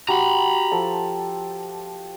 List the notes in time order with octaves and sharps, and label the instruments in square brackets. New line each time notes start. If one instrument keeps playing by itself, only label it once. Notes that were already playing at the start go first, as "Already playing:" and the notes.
[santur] F#4 G4 [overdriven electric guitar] A#5 B5
[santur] F3 A4 A5